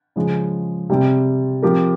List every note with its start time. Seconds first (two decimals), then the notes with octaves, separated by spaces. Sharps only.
0.16 C#3 F3 G#3
0.90 C3 G3 C4
1.63 F3 C4 G4 A#4